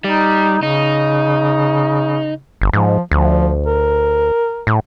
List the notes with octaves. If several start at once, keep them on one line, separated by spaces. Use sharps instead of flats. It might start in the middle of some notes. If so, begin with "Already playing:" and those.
G3 D#4
C#3 D#4
G1
G#2 F3
D2 F3
A#4
A2